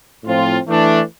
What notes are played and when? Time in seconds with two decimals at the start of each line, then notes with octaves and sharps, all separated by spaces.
0.24 A2 F3 C4 F4
0.67 E3 A3 D4